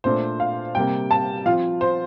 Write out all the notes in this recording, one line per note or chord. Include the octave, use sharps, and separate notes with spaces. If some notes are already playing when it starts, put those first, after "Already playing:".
A#2 A3 D4 C5
F5
C3 G3 A#3 G5
A5
F3 C4 F4 F5
C5